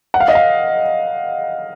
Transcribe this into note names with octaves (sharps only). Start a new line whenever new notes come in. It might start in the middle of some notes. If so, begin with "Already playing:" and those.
F#5
F5
D#5
F5